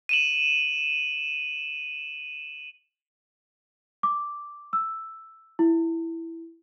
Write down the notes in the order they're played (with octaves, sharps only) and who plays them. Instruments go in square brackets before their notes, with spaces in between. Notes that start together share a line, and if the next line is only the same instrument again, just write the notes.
[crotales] D#7 E7 F#7
[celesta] D6
E6
E4